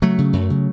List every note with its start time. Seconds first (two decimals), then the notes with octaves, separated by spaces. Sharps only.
0.02 C#3 F#3 A3
0.18 C#3
0.33 F#2
0.50 C#3